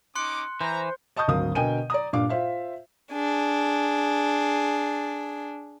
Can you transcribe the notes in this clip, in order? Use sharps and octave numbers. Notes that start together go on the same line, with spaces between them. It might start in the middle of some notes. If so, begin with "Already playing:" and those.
C#4 D#4 C6 D6 F#6 C#7
E3 C5 A#5
D#5 A5 C#6 D#6 G6
G#1 D2 F#3 A#4 F5 D#6
B2 D3 A#4 G5 G#5 D#7
D5 A#5 D#6
G2 A#2 D4 F5 D6
F4 C5 E5 F5
D4 G#4